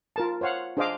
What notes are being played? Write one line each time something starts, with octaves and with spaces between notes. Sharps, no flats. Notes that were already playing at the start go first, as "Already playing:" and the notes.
F4 A#4 A5
C5 C#5 F5 F#5
D4 G#4 C5 D#5 F5 D6